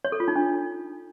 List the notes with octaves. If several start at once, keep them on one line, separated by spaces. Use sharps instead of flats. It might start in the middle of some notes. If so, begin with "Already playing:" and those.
C#5
A4
F4
D#4
D4